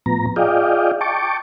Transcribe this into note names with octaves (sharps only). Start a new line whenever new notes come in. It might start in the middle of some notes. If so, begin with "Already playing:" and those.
A2 F3 B3 A#5
F4 G#4 D5 D#5 F5 G5
G5 A5 C#6 D6